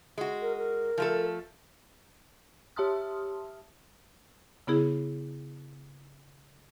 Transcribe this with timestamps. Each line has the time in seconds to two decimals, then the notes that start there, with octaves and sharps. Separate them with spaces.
0.18 G#3 F#4
0.41 A#4
0.58 A#4
0.98 F3 A3 A4
2.76 G4 E5 A5 C6 D#6 F6
4.67 C#3 B3 E4 G#4